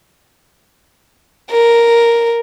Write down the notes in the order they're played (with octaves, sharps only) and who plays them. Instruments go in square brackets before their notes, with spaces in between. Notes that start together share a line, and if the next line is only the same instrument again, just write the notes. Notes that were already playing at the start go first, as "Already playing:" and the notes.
[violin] A#4